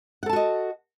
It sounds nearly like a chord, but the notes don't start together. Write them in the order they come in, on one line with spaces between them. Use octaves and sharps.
F#5 A4 A5 F#4 D#5